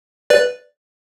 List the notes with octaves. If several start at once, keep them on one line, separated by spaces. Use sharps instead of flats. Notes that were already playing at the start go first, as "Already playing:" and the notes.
B4 D5